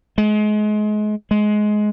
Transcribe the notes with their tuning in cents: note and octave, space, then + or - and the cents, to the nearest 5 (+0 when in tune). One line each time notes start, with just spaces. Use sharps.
G#3 +30
G#3 +20